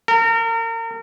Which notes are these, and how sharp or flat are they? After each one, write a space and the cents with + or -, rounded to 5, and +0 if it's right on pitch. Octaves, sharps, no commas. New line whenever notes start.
A#4 -35